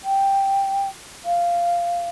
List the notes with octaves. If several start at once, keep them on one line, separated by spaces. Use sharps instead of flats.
G5
F5